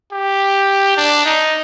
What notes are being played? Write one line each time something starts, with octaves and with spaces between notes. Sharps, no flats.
G4
D4
D#4